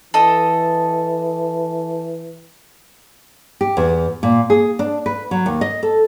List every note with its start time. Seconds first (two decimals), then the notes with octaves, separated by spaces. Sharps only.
0.14 E3 A4 D#5
3.61 G4
3.77 E2
4.23 A#2
4.50 G#4
4.79 D4
5.06 B4
5.31 F#3
5.46 D#2
5.61 D#5
5.83 A4